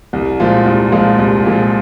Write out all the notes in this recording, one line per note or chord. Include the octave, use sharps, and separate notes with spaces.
C2
A#2 F3 G#3
C2
A#2 F3 G#3
C2
A#2 F3 G#3